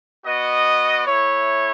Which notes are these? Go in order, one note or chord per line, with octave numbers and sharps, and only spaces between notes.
B3 F#4 D#5
A3 E4 C#5